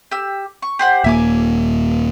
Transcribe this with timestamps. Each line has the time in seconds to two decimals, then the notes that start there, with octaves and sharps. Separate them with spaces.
0.11 G4 E6
0.62 C#6
0.79 G4 C5 F#5
1.04 D#1 A#3 E5 G#5 D6